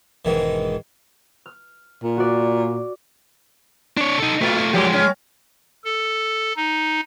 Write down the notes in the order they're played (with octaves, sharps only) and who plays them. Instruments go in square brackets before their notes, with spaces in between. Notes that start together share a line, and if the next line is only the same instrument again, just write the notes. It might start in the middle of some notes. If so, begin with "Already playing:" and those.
[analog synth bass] E1 [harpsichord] G#2 D#3 E3
[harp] F6
[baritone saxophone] A#2
[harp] F#4 D5
[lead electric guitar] D4 C#5
D#4 A4
[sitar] A#2 [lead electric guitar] A3 F4
[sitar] A#2 F#3 G4 [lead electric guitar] F3 G#3
[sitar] C#4
[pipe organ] A4
D#4